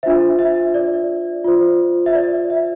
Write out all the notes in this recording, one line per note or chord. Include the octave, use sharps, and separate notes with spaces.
D4 F4 C5 E5
E5
D5
F4 C5
E5
D5
E5